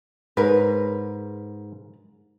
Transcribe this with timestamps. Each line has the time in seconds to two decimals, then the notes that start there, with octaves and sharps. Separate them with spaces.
0.37 G#2 A#4 B4